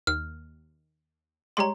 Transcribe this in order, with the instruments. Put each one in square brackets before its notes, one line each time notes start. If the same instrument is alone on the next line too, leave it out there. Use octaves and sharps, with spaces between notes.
[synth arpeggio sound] D#2 [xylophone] F6
[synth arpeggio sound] G3 G#3 C#5 [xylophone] A#5 C6